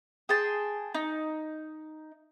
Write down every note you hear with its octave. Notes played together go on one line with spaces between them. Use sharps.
G#4 G5 A5 C6
D#4